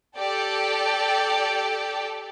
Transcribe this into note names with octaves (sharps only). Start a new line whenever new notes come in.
G4 A4 D5 G5